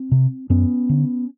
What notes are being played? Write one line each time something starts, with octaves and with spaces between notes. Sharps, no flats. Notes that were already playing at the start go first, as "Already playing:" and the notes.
Already playing: C4
C3
F#2 B3 C#4
D3